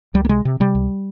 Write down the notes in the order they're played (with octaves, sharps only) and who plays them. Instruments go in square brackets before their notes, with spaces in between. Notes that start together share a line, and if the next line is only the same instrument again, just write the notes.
[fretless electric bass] C#2 G3
A#3
C3 G#3
C3
C3 G3
C#2